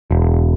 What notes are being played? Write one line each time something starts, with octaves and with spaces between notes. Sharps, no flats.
E1